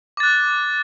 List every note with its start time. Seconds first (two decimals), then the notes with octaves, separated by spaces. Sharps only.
0.17 D6
0.20 A6
0.23 F#6